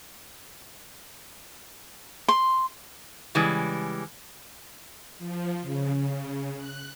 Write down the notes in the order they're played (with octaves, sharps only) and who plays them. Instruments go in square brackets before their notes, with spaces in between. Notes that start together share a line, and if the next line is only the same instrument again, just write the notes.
[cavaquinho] C6
[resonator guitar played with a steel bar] C#3 E3 G3 G#3
[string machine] F3
C#3
C#3
F#6